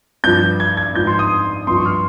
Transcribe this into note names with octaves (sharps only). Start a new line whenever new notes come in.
G2 F3 G6
G#6
G#6
G#2 F3 G6
C6
D#6
G2 F3 C6
C#6
F6